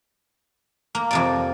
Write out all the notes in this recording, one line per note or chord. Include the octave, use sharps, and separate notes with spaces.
A#3
F2 C3 D5